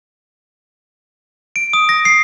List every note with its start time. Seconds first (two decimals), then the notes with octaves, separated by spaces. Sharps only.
1.56 D7
1.73 D#6
1.89 A#6
2.05 C7